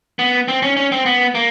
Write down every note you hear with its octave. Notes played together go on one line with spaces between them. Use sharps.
B3
C4
C#4
C#4
C4
B3
A#3